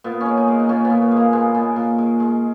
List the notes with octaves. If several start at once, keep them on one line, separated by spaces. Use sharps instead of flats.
A#2 B3
G#3 C#4
D#4
G#3
D#4
A#2 C#4
B3
A#2
B3
G#3
A#3
G#3 B3
A#2
A#2
G#3
G#3